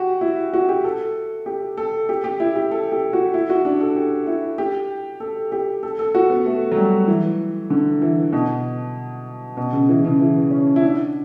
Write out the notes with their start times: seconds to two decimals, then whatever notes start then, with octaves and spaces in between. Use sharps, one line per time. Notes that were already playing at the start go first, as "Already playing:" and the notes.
Already playing: F#4 G4
0.21 E4
0.53 F#4
0.69 G4
0.84 A4
1.46 G4
1.77 A4
2.09 G4
2.24 G4
2.40 E4
2.56 G4
2.71 A4
2.92 G4
3.13 F#4
3.34 E4
3.50 F#4
3.65 D4
3.80 A4
3.96 G4
4.27 E4
4.58 G4
5.20 A4
5.52 G4
5.83 A4
5.99 A4
6.15 F#4
6.30 B3
6.46 A3
6.72 F#3
6.77 G3
7.08 E3
7.70 D3
8.02 E3
8.32 B2
9.57 B2
9.72 C#3
9.89 E3
10.05 C#3
10.20 E3
10.51 C#4
10.76 E4
10.82 D4